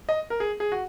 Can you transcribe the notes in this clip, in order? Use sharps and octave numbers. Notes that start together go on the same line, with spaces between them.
D#5
A#4
G#4
G#4
F#4